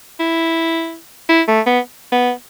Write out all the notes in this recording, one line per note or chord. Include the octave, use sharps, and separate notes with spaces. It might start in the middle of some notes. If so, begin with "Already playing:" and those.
E4
E4
A3
B3
B3